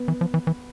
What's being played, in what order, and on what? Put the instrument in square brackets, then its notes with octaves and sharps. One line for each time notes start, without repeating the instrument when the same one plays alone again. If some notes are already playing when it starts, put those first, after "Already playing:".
Already playing: [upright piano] B3
[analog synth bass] E3
F3
E3
E3